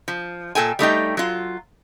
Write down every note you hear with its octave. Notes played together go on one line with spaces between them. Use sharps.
F3
A#2 A4 G5 G#5
G3 A3 D#4 G5
F#3 F4